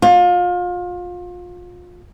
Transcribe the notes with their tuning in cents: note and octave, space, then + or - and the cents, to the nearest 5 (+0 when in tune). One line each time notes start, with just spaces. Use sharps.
F4 +30